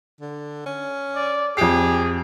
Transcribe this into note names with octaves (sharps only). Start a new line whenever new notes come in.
D3
C#4
D5
F2 G4 G#4 C7